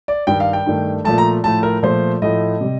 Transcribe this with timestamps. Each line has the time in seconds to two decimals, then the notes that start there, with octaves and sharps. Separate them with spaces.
0.08 D5
0.27 G2 D#3 G3 G5
0.40 F5
0.53 G5
0.66 G2 D#3 A3
1.05 A#2 F3 A3 A5
1.18 A#5
1.44 A2 F3 A3 A5
1.63 A#4
1.83 A#2 F3 A3 C5
2.22 A2 F3 A3 D#5
2.61 C3 G3